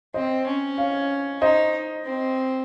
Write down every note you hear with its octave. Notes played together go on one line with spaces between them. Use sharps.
C4 C5 D#5
C#4
C#5 F5
D#4 C5 D#5
C4